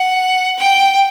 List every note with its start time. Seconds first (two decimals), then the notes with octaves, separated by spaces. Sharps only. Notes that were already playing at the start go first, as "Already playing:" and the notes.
Already playing: F#5
0.58 G5